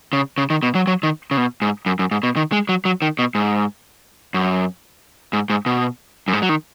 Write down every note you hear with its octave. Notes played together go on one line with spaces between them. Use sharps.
C#3
C#3
D#3
B2
F#3
F#3
D#3
C#3
B2
G#2
F#2
F#2
G#2
B2
D#3
G#3
F#3
F#3
D#3
B2
G#2
F#2
G#2
G#2
B2
F#2
G#2
F#3
D#3